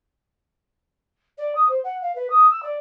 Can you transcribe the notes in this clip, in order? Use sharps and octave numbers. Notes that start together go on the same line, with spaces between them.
D5
D#6
C5
F#5
F5
B4
D#6
E6
D5